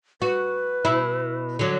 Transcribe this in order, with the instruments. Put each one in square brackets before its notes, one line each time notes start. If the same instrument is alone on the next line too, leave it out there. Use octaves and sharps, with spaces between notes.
[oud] F#4 [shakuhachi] B4
[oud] B2 E4
D3 F#3